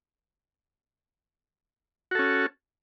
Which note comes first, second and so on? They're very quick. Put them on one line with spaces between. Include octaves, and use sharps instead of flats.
F#4 A4 C#4